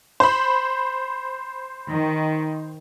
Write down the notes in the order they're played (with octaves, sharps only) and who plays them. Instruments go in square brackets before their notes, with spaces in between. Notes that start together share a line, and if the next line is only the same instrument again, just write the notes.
[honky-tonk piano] C5 B5
[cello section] D#3